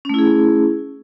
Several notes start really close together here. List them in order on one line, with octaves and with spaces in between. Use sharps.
C#4 A3 E4 G#4